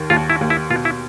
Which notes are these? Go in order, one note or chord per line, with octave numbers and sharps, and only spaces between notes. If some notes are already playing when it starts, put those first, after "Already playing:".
Already playing: D#2 D#3
D#2 F4
E4
D#2
E4
B2 F4
E4